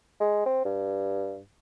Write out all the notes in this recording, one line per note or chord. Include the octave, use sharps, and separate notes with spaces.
G#3
C4
G2